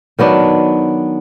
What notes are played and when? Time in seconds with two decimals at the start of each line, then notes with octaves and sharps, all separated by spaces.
0.19 D#3 F#3 B3 D4